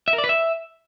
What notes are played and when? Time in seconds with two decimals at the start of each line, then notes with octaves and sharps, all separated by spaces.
0.08 E5
0.13 A#4
0.18 D5
0.24 B4
0.29 E5